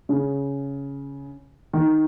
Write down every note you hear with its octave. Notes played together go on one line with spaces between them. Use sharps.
C#3
D#3